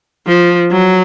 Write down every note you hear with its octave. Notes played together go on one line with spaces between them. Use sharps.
F3
F#3